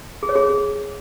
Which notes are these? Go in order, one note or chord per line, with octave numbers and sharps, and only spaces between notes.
G#4
C#5
G#4